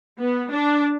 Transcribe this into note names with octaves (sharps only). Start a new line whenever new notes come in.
B3
D4